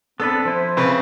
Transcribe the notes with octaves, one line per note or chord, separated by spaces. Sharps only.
B3 C4 D4 A4 B4
F3 E4 C5
C#3 C4 B4